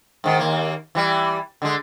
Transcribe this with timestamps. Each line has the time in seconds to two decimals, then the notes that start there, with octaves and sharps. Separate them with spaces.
0.24 G#2 D#3
0.39 D#2 A#3
0.95 E3 G3
1.62 D3 G#3